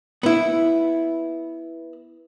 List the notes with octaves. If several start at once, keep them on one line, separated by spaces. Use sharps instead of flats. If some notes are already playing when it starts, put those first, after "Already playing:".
B3 E4